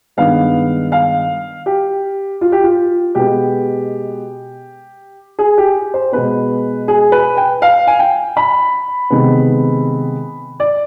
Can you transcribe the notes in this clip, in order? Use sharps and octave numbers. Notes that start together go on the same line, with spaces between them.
G2 D#3 G#3 B3 F5
F5
G4
F4
G4
F4
B2 G#3 B3 G4
G#4
G4
C5
B2 G#3 B3 B4
G#4
B4
G5
F5
G#5
G5
B5
C3 D#3 G#3 B3
D5